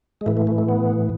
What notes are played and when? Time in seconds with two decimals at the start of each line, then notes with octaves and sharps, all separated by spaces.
0.21 G#3
0.26 A2 E3 A3
0.37 A3
0.47 A3
0.58 A3
0.68 B3